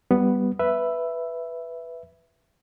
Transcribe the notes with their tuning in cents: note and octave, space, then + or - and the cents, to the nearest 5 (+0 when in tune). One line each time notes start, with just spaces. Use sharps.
G3 +0 B3 +0
B4 +0 E5 +10